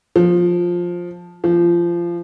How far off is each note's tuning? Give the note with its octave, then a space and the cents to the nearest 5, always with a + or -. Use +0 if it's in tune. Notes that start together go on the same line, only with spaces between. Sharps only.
F3 +10
F3 -20